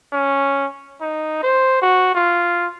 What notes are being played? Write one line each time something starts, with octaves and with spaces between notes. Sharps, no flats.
C#4
D#4
C5
F#4
F4